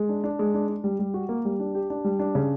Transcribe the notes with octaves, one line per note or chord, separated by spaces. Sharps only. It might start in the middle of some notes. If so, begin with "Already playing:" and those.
Already playing: G#3
D4
D4
G#3
D4
D4
G3
G3
F#4
A#3
G3
D4
G4
D4
G3
D4
C#3